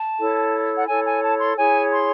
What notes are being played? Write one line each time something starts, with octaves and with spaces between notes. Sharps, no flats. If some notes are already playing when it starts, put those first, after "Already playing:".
Already playing: A5
E4 A4 C#5
F#5
E4 A4 C#5 G#5
G#5
A5
C6
E4 G#4 C#5 G#5
C6